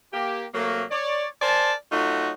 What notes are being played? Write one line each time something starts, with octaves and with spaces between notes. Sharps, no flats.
A#3 G4
C3 F#3 A3 A#3
C#5 D5
A#4 C5 D5 G#5 A5
F#3 A3 D#4 F4 F#4